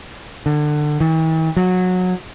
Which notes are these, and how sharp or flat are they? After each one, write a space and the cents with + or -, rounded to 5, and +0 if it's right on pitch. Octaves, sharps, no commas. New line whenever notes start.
D3 +25
E3 -45
F#3 -20